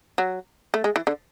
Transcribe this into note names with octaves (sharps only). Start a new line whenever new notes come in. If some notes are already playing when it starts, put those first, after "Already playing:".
F#3
A3
G#3
E3
D3